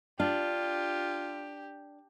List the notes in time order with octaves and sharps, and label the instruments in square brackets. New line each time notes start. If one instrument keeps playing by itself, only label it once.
[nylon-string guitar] D4 [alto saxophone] F4 [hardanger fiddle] G4